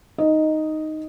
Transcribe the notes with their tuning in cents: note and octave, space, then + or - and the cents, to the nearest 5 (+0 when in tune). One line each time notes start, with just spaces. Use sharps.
D#4 +0 D#5 +0